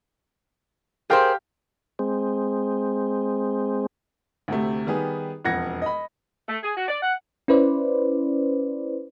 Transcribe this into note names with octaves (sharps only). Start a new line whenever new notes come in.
G4 G#4 A#4 C5 F5 G5
G#3 C4
D2 C3 A3
D#3 G3 B3 G4 G#4
E1 F2 F#5 G#6 A#6 C#7
D#5 B5
A3
G#4
F#4
D5
F#5
C#4 E4 B4 C5 D5